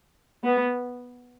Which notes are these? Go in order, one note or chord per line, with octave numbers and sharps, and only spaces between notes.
B3